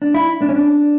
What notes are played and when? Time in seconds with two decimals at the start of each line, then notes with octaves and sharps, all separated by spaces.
0.02 D4
0.14 E4
0.42 D4
0.49 C#4
0.56 D4